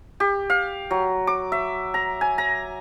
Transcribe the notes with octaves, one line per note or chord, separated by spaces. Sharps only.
G4
F5
F#3
D6
E5
A#5
G#5
A#5